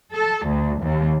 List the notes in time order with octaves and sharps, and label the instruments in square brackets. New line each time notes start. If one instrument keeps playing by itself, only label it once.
[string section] A4
D2
D#2